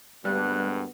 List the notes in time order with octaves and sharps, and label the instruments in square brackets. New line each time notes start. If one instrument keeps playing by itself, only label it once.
[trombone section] D2 G2 [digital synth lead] G3 [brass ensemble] G#3 A#3 B3 [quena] F#6